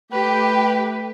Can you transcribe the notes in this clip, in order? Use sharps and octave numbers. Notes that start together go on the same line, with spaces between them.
A3 G4 B4